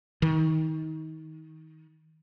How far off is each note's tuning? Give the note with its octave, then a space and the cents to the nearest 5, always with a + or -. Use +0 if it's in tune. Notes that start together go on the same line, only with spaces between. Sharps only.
D#3 +25